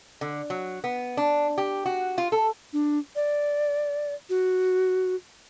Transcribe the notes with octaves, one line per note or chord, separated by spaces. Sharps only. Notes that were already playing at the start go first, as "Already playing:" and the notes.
D3
F#3
B3
D4
G4
F#4
F4
A4
D4
D5
F#4